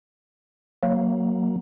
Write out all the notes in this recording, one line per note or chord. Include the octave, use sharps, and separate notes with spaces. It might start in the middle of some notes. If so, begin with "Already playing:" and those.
F#3 A#3